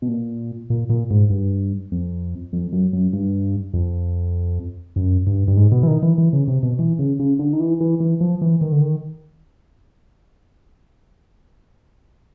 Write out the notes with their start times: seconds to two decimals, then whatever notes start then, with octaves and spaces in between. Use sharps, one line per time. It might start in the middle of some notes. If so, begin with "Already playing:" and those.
0.02 B2
0.09 A#2
0.70 A#2
0.90 A#2
1.11 G#2
1.30 G2
1.92 F2
2.53 F2
2.72 F#2
2.93 F#2
3.13 G2
3.74 F2
4.96 F#2
5.27 G2
5.48 G2
5.57 G#2
5.72 B2
5.83 E3
5.87 D#3
6.03 E3
6.18 E3
6.33 C#3
6.48 C3
6.63 B2
6.79 E3
6.99 C#3
7.20 C#3
7.39 D3
7.53 D#3
7.60 E3
7.81 E3
8.00 E3
8.21 F3
8.41 E3
8.61 D#3
8.72 D3
8.81 D#3